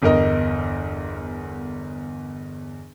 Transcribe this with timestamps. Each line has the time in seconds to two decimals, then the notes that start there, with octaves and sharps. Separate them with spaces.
0.02 G1 E2 A#4 D#5